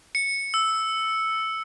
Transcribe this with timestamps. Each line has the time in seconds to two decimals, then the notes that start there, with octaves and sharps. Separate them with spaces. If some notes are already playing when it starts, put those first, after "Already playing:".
0.15 C#7
0.54 E6